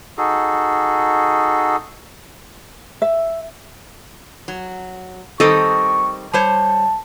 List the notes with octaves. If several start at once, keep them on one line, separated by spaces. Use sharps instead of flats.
D#4 F#4 G#4 A4
E5
F#3
D#3 G3 C4 A4 D#5 C#6
G3 C5 C#5 A5